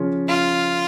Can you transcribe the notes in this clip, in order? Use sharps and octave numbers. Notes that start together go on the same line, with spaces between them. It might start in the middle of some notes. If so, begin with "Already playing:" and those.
Already playing: C#3 F3 C#4 F4
F4